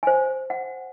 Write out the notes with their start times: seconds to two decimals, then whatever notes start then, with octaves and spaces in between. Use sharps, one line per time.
0.03 C5 G#5
0.50 F#5